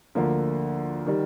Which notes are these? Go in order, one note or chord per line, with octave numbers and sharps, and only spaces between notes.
D2 D3 F3 A#3
D#3 G3